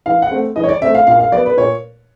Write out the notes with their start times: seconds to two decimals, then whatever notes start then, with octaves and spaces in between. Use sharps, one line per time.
0.06 E3 F5
0.22 F#5
0.31 A3 C4
0.56 E3 D#5
0.64 C#5
0.69 D5
0.82 A3 C4 E5
0.95 F5
1.07 A#2 F5
1.20 F5
1.32 F#3 B3 D5
1.46 B4
1.57 A#2 C#5